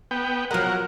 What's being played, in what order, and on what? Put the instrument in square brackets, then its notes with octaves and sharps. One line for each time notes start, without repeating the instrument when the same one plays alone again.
[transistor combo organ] B3 G5
[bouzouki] F3 G#3 [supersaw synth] F#3 A#4 [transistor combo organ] F#5